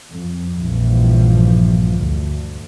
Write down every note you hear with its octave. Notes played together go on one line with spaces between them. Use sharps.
F2
A#1 G2 E3 F3
D2